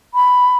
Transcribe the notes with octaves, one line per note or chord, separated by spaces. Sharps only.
B5